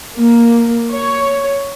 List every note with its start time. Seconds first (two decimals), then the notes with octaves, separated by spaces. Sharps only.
0.17 A#3
0.91 C#5